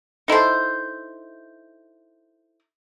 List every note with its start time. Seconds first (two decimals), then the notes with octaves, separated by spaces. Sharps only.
0.28 D#4 E4 A4 C5